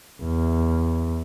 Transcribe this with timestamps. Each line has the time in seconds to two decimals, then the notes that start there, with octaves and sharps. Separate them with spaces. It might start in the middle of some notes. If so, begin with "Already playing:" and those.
0.23 E2